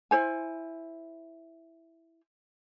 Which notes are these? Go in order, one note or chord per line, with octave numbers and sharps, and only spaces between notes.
E4 C5 G#5